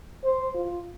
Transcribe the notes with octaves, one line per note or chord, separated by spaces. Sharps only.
C5
F4